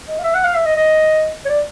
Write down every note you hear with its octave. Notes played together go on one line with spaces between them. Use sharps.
D#5
F5
E5
F#5
F5
E5
D#5
D#5
C#5
D5